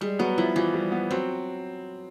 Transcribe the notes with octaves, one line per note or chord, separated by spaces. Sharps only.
G3 G#3
F#3 B3
F3 E4
E3 F3
G3
B3
F#3 C4